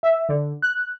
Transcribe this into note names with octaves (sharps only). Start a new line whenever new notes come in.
E5
D3
F#6